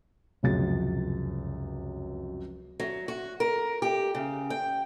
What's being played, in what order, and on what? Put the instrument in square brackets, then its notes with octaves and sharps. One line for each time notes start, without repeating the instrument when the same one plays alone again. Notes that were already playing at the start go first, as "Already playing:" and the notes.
[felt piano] F1 C#2 F#2 A6
[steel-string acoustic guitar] F#3
F#4
A#4
G4
C#3
G5